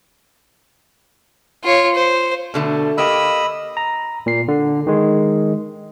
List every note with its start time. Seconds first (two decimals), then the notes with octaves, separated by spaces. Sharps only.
1.64 F4 C#5
1.95 C5
2.54 B2 D3 A3
2.98 A#3 G4 D#5 B5 E6
3.77 A#5
4.26 A#2 C7
4.48 D3
4.87 D#3 G#3